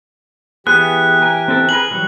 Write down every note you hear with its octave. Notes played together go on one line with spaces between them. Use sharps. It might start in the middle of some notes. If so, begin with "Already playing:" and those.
E3 B3 G4 G#4 F#6
A#4 G#5
C4 A4 A#4
G#4 A#4 B4 F#7
E3 F#3 G3